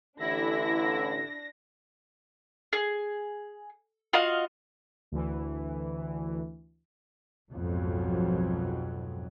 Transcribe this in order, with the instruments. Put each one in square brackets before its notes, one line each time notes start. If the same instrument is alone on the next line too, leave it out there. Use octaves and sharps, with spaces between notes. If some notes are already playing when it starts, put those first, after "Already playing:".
[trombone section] A1 D3 [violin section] D4 A#6 [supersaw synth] E4
[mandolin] G#4
F4 F#4 D#5 F5
[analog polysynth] D2 E3
[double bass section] B1 F2 G#2 B2 F#3